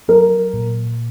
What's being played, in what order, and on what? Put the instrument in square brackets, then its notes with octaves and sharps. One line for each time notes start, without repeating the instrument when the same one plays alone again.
[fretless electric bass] F#3 [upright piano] A#4
[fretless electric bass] A#2